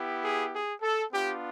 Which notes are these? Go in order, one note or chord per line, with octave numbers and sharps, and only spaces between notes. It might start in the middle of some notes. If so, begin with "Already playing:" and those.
Already playing: B3 E4 G4
G#4
G#4
A4
B3 D4 F4 G4